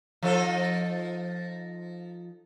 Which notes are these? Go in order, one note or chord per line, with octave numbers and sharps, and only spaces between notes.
F3 D#4 A4